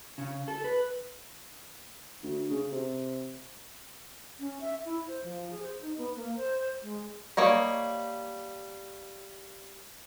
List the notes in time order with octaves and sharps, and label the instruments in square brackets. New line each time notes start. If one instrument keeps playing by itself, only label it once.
[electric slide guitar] C#3
A4
B4
[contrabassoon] D2
C#3
C3
[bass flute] C#4
E5
E4
C5
F3
G#4
C5
D#4
B3
A#3
C5
G#3
[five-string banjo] G3 A#3 C#5 D#5